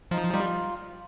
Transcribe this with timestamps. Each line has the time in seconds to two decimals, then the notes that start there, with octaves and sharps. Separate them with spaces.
0.11 F3 D#4
0.34 G3 F4